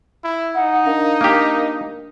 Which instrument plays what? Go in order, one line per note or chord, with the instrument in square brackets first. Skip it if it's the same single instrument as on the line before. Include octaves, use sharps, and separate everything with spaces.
[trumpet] E4
[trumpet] D#4 [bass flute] F#5
[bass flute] D4 [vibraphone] A#4 F5
[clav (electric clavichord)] A#3 G4